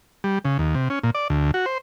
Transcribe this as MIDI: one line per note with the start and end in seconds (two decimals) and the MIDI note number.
0.24 0.39 55
0.45 0.58 49
0.59 0.75 39
0.75 0.89 48
0.90 0.99 61
1.03 1.11 46
1.15 1.28 74
1.30 1.51 38
1.54 1.66 66
1.66 1.78 72